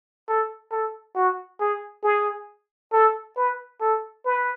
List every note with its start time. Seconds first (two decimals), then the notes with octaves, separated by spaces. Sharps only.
0.28 A4
0.71 A4
1.16 F#4
1.60 G#4
2.04 G#4
2.93 A4
3.37 B4
3.81 A4
4.25 B4